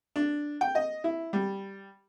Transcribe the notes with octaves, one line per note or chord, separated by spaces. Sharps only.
D4
G5
D#5
E4
G3